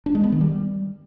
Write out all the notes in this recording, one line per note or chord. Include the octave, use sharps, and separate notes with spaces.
D4
G#3
B3
D#3
G3